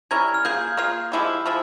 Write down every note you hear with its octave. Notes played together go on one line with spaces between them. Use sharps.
G3 C#4 E4 A#4 G#6
F6
A#3 F4 G#4 G6
A#3 F4 G#4 F6
F3 G#3 E4 G4
F3 G#3 E4